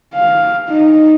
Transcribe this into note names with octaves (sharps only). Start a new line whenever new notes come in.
F5
D#4